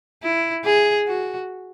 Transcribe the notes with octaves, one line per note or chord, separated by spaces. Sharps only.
E4
G#4
F#4